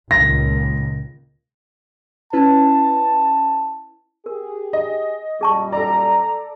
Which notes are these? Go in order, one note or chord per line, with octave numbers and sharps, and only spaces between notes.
C#2 A#2 D#3 A#6
C#4 E4 B4 A5
G4 G#4 A#4
D#5
F#2 A#2 G3 G#4 A5 C#6
A4 D5 A#5